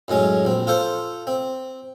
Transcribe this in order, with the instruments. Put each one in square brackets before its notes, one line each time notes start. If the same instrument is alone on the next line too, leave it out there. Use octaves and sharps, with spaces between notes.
[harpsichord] F#2 A2 G#3 C#4
A#1 C4
F4 A4 C5
C4